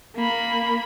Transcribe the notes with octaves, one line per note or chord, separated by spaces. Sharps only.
A#3 B5